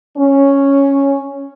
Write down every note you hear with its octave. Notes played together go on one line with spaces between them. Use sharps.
C#4